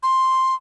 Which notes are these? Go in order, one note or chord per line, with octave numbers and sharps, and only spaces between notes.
C6